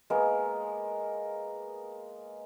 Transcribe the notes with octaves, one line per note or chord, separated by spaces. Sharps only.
G#3 A#3 B3 A#4